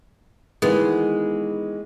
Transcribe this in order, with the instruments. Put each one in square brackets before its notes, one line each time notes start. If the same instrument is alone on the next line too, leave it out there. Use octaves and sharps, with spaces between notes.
[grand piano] D#3 E3 [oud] G#3 B3